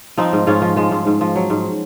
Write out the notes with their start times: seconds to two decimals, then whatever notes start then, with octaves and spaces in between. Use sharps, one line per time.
0.17 F3 C4 D#4
0.33 G#2
0.47 G#2 C#4 F4
0.62 F3
0.76 F3 G#3
0.91 G#2
1.07 G#2
1.21 F3
1.35 F#3
1.50 G#2